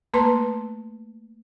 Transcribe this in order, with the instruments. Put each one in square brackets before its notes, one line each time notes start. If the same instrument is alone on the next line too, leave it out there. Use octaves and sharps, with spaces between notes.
[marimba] A3 A#3 B4 C6